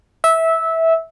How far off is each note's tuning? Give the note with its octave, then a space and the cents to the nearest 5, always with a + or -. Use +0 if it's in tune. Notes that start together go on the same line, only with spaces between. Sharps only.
E5 -15